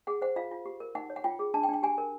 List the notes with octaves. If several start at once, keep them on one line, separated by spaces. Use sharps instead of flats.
G#4 F#5
C5 F#5
F4 F5
F4
G4
A#4
D#4 F#5
C#5
F#5
F4 G5
G#4
D4 A5
G5
D4
G5
G4 G#5
A#4